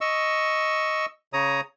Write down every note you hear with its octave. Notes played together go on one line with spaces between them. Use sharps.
D#5 C#6 E6
C#3 C#5 A#5 D#6